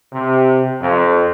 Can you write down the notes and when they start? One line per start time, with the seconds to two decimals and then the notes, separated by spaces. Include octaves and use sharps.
0.13 C3
0.81 F2